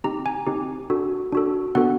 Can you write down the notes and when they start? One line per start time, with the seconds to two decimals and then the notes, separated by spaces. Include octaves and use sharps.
0.04 C4 D#4 G4 A#5
0.26 G#5
0.47 C4 D#4 G4
0.90 D4 F#4 A4
1.32 D4 F#4 A4
1.75 B3 D4 F#4 A4 F#5